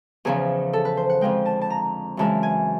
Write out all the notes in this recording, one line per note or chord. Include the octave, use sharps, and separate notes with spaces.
E2 C#3 F3 G#4
A4
B4
C5
F#5
F2 D3 F3 G#3 G5
A5
A5
A#5
F#2 C#3 E3 G#3 A5
G#5